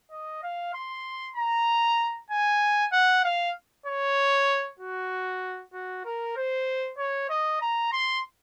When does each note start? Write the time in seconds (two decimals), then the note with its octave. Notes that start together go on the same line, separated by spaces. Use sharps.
0.11 D#5
0.43 F5
0.74 C6
1.36 A#5
2.30 G#5
2.93 F#5
3.24 F5
3.86 C#5
4.79 F#4
5.73 F#4
6.05 A#4
6.36 C5
6.98 C#5
7.30 D#5
7.61 A#5
7.92 C6